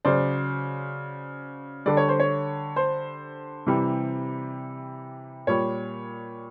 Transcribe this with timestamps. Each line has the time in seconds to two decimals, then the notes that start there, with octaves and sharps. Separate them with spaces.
0.05 C#3 F#3 C5 D5
1.86 D3 G3 D5
1.97 C#5
2.09 C5
2.20 C#5
2.76 C5
3.67 C3 E3 G3
5.47 A#2 G3 C#5